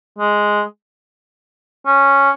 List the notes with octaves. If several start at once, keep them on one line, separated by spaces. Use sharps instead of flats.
G#3
C#4